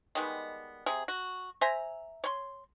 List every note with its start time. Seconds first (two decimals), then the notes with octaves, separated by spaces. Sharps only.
0.15 D#3 G3 G#3 B3
0.86 C3 G#4
1.08 F#4
1.61 C5 E5 G#5 A#5
2.24 C#5 C6